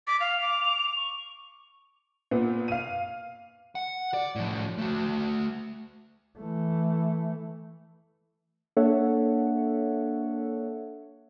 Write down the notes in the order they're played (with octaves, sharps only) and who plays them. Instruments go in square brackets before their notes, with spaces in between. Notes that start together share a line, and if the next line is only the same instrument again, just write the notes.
[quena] D6 [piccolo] B6
[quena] F5 [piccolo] F7
[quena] D6
[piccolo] C#6
[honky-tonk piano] A#2 B3
F5 D#7
[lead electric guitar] F#5
D5
A2 F3
A3 F#4
[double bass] E3 A3
[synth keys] A#3 D4 A4 C#5 E5 F#5